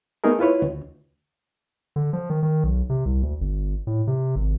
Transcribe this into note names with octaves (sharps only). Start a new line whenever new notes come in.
A3 B3 D#4 G#4 A#4
E4 F4 B4 C#5
D2
D3
F3
D#3
D#3
B1
C3
C2
D2
G1
A2
C3
G#1